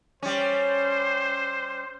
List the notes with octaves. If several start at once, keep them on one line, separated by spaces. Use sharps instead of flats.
G3 C#4 C5